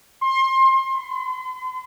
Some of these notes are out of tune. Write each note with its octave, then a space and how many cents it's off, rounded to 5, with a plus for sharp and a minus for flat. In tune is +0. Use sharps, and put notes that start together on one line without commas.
C6 +30
C6 -40